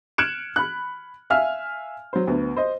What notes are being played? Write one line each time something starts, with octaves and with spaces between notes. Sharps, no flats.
F6 F#6 G#6 C#7 D7 E7
B5 F#6
E5 F5 G#5 F6
F#3 C5
D2 B3
C5 D#5